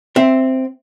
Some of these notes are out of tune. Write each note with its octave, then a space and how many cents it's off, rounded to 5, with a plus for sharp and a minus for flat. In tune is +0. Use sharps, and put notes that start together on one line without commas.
C4 +0 E5 +5